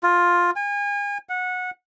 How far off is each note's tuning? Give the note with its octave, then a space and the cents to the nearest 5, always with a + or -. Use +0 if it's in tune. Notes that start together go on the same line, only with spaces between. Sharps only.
F4 +10
G#5 -35
F#5 -20